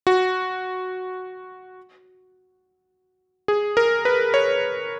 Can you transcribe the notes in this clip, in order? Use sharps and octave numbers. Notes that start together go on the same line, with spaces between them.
F#4
G#4
A#4
B4
C#5